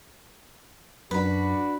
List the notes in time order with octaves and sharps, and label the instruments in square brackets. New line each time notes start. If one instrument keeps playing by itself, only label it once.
[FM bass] F#2 [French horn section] D4 F#4 [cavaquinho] B4 B5